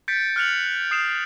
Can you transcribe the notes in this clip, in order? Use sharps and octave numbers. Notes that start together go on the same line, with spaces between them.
G6 A6 B6 C#7 D7
F6 F#6 C#7 F7 F#7
D#6 C7 D7 E7